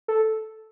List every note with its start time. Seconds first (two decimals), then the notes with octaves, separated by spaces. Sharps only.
0.08 A4